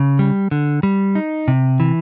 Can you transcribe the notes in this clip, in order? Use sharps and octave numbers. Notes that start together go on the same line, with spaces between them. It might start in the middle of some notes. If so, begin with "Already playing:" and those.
Already playing: C#3
G3
D3
G3
D#4
C3
E3